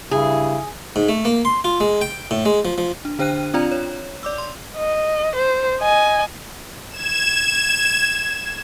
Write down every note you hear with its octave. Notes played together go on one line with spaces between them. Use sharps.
G2 C#3 E4 G#4
G#2
A3
A#3
C6
F4
G#3
G5
A2
G#3
F3
F3
D4
D3 D4 C5 G5 F#6 D#7
C4 D4 F4 D5 A#5
C#5
D5 D6 E6
C6
D#5
C5
D#5 G#5
G#6 E7